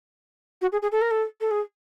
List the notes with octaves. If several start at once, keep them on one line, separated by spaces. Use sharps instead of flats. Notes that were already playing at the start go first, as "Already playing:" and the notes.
F#4
G#4
G#4
A4
A#4
A4
A4
G#4